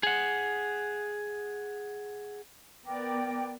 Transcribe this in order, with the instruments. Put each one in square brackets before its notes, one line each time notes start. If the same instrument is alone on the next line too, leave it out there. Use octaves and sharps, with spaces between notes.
[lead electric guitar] G#4 F#5
[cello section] B3 A#4 D5 [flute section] G5 D6